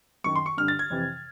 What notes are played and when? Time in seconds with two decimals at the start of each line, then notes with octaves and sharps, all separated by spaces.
0.24 F#2 D#3 C#6
0.35 C6
0.46 C#6
0.57 G2 D3 F6
0.68 A6
0.79 G#6
0.90 F2 C3 E3